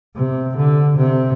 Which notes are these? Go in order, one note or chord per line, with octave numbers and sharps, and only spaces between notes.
C3
D3
C3